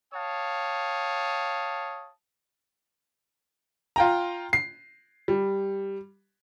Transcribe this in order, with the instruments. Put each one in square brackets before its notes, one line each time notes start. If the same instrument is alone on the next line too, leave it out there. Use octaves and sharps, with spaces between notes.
[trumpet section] C#5 F5 G5 A5 D#6
[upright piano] F4 G5 A#5
C7
G3